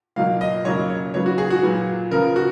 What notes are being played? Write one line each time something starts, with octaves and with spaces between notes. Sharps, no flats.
B2 F#3 A#3 F5
D#5
F#2 C#3 F#3 A#3 C#5
C#5
C#3 F#3 B3 C#5
F#4
G#4
F#4
A#2 F#3 B3
C#3 F3 B3 A#4
F#4